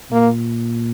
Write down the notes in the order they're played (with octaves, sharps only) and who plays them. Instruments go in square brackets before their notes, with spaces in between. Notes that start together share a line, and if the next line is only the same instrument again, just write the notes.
[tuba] A#2 [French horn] A#3